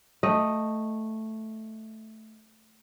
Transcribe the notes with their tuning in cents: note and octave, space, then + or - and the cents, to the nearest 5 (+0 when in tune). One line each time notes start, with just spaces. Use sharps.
A3 +0 D#5 +0 G5 +0